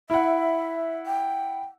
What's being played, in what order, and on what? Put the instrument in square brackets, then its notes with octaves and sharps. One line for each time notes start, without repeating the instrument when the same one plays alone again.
[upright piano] E4 F#5 [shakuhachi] E5
[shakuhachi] G5